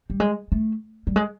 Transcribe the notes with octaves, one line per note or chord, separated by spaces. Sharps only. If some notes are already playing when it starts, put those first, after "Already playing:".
G3
G#3
A3
G3
G#3